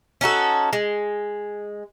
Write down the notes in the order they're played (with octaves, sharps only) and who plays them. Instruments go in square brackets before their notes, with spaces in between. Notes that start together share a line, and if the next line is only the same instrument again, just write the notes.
[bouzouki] C#4 D#4 F#4 A4
G#3